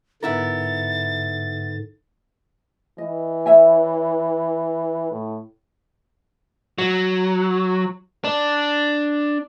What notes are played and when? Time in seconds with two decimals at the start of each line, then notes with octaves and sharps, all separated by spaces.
0.23 G#2 D3 B3 E4 A#4 A6
2.98 E3 D#5
3.46 C#5 E5 G#5
5.11 A2
6.78 F#3
8.24 D4